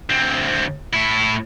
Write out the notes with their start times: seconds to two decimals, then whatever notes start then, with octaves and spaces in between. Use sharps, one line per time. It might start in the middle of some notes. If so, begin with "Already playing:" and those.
0.10 D2 C4
0.93 A2 E4